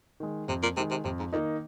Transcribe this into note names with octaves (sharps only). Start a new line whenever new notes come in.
D#3 G#3
F2 C3
A#2
C3 D#3 G#3
C3
F2 C3
G#2
F2 D#3 A#3 D#4